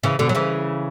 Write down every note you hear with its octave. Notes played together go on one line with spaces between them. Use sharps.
C#3 E3
B2 D3
F#3
C#3 E3